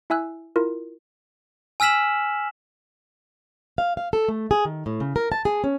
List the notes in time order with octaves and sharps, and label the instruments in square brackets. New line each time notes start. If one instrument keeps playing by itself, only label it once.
[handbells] E4 E5 G#5 E6 F#6
E4 F4 A#4
[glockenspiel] G#5 E6 F6 B6 E7 F#7
[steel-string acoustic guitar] F5
F5
A4
A3
G#4
D#3
A2
C#3
A#4
A5
G#4
C#4